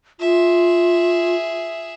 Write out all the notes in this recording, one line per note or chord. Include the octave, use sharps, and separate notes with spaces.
F4 G#4 E5